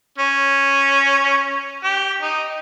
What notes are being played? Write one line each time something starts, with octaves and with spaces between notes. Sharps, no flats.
C#4
G4
D#4